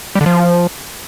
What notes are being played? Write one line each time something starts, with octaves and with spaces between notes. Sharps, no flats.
G3
D3
F3